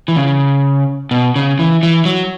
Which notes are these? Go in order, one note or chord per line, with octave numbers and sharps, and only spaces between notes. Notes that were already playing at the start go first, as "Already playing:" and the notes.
E3
C#3
B2
C#3
E3
E3
F#3